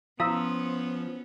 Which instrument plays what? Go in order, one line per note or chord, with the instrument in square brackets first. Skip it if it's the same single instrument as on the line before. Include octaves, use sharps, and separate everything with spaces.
[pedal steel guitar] F3 [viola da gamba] B3 C#4 [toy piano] E4 F5 A#5 [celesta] D#6 E6